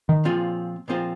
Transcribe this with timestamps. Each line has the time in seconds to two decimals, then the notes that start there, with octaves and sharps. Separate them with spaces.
0.09 D#3
0.25 A#2 F3 C4 F4 G#4
0.88 A#2 F3 C4 F4 G#4